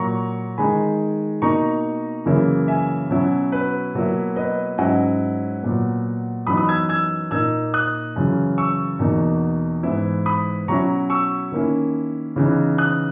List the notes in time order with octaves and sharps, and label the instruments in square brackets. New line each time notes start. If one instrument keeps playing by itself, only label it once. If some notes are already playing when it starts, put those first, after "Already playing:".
Already playing: [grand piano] A#2 F#3 A#3 E4 A#5 C#6
D#3 G#3 D#4 G#5 B5
B2 A#3 D#4 A#5 C#6
F#2 C#3 E3 A#3 E4
E5 G#5
B2 F#3 C#4 E4
B4
B2 F#3 A#3 E4
B4 D#5
G#2 F#3 C#4 E4 D#5 F#5
A#2 F#3 B3
F#2 E3 B3 D#4 B5 D#6
B5 D#6
E6 G#6
E6 G#6
A#2 A#3 D#4 E6 G#6
D#6 F#6
F#2 C#3 E3
C#6 E6
E2 B2 A#3 D#4
G#2 E3 B3 E4
B5 D#6
B2 F#3 C#4 E4 A#5 C#6
C#6 E6
D#3 A#3 C#4 E4
C#3 E3 B3 D#4
D#6 F#6